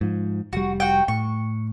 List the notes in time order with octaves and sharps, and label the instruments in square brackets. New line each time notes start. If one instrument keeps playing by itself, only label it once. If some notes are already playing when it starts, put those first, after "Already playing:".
[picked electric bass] G#2 F3
[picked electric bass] F1 G3 [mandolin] F#4
[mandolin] F#4 G5
[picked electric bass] A2 [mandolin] C#6